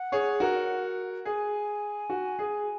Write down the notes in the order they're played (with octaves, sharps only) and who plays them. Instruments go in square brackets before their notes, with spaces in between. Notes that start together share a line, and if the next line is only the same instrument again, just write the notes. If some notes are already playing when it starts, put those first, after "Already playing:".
Already playing: [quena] F#5
[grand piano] G#4 C#5
F#4 A#4
[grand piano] G#4 [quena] G#5
[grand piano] F#4
G#4